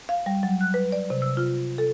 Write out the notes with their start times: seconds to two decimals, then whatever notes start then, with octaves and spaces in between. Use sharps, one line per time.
0.09 F5
0.26 G3
0.43 F#3
0.61 F#6
0.74 B4
0.92 D5
1.10 C3
1.22 E6
1.37 F4
1.78 A4